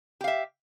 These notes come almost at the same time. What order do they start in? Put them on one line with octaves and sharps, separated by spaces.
G4 F5 E5